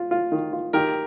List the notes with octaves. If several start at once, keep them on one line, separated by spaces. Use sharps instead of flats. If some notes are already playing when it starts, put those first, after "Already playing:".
Already playing: F4
F4
D#3
F4
D#3 G4 A#4